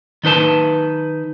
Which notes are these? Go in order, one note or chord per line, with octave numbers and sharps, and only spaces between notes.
D#3 D#4 B4 A5